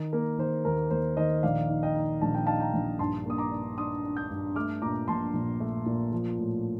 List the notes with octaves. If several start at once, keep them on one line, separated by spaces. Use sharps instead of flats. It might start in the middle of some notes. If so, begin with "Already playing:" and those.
Already playing: D#3
A#3 A#4
D#3 C5
D#2 A#4
D#2 C5
D#3 C5 D#5
A#1 D5 F5
D#4
D#5 G5
D#4
A#1 A5
G5
D#4 F5 A5
G5 A#5
A#1
G2 A5 C6
A#3 D#6
A#5 D6
D4
D4 C6 D#6
D4
D#6 G6
G2
A3 D6 F6
A#2 A#5 D6
A#1 A5 C6
A#1
A3
A#2
F3
A2